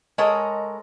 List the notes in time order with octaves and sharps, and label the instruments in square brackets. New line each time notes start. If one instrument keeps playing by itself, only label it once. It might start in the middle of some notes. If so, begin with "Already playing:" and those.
[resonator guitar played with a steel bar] G#3 A4 A#4 C#5 D#5